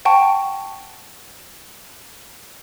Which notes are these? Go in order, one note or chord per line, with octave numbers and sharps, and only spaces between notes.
F#5 G5 A5 C#6